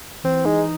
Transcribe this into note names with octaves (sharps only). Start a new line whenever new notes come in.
E3 C4
G#3 D#4